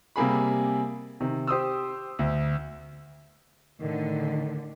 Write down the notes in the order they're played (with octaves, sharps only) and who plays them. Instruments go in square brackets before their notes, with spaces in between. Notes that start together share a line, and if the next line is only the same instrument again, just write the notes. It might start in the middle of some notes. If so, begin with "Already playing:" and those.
[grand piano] C3 G3 A#3 G#4 B5
C3 D#3
G4 C5 D#6 E6
D2
[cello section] A2 D3 [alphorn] D#3